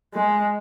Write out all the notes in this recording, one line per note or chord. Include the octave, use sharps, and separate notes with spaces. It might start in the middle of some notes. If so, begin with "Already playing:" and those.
G#3